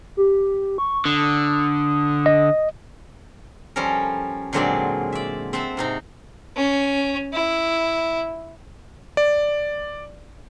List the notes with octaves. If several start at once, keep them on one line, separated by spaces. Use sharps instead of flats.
G4
C#6
D3 D#6
D#5
F3 G3 C#4 A4 A#4
A#2 D3 F#3 G#3 C4 D5
D5 E5
C4 C5 E5 F#5 A5
G#2 C3 D#4
C#4
E4
D5